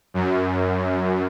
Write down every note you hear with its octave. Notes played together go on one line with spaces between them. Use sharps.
F#2